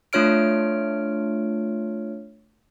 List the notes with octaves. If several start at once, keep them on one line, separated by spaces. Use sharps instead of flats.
A3 D4 F4 C#5 F6 D7